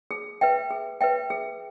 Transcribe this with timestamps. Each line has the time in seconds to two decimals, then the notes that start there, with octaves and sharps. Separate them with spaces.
0.11 G#4
0.41 B4 E5 G5
0.70 G#4
1.01 B4 E5 G5
1.30 G#4